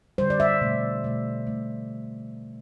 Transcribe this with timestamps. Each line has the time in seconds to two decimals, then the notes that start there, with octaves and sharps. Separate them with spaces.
0.18 D3 G3 C5
0.30 D5
0.40 E5
0.61 B2 A3
1.04 B2 A3
1.47 B2 A3